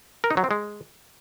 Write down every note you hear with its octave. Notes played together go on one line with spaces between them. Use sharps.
A#4
D#4
F#3
C4
G#3